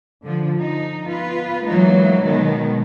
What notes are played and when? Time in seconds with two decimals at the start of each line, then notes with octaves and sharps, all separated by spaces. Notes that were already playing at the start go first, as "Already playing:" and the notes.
0.24 D3 F3
0.59 D#4
1.05 B3 F4 B4
1.65 E3 F#3 G#3 A#3 D#4
2.24 B2 D#3 G#3 B3